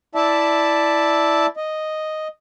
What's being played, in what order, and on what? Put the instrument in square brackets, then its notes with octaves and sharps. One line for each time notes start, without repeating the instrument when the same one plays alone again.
[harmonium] E4 D5 E5 A5
D#5